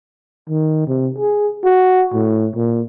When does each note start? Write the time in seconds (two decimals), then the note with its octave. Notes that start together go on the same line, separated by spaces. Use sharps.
0.49 D#3
0.87 C3
1.18 G#4
1.64 F#4
2.13 A2
2.55 A#2